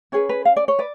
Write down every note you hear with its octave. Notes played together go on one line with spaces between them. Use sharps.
C#4 G#4 B4 C#5
B4
F5
D5
C#5
B4 D5